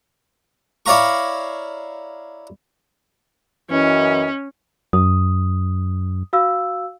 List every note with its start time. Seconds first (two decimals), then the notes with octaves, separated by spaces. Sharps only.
0.86 E4 C#5 D5 F5 A#5 C#6
3.70 F#2 E3 C#4 D#5
4.93 F#2 D#6
6.33 F#4 F5 E6